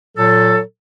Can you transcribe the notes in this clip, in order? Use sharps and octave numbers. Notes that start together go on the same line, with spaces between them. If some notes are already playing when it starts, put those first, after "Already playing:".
A#2 F#3 A4